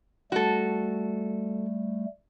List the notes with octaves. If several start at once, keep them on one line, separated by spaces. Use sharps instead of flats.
G3 A3 F#4 A4